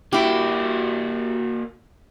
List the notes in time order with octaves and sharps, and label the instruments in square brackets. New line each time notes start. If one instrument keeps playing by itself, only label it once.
[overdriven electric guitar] A#3 F#4 [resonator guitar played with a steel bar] E4 G4